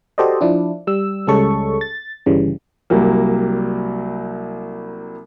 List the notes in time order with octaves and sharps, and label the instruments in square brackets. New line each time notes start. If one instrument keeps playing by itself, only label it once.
[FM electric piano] F#4 G4 A4 C5 D5 D#5
F3 D4 E4
G3 E6
C#2 G3 G#3 C#4 A4 C#6
A6
G1 C#3 E3 G3
[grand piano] C2 F#3 G3 A#3